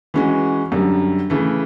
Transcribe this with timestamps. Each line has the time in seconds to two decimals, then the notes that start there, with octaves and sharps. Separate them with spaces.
0.14 E3 G#3 C#4 F#4
0.72 F#2 D3 G3
1.30 C#3 E3 A3